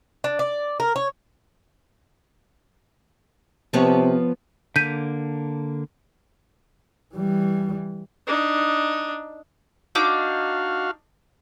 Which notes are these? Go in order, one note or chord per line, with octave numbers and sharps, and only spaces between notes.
D4
D5
A#4
C#5
C3 F3 B3 C#5
D3 A#3 G6 B6 D#7
E3 G3
D4 D#4
D4 D#4 F#4 F5 D6